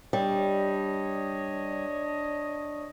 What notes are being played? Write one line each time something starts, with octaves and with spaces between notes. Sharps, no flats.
G3 D4 C#5 D#5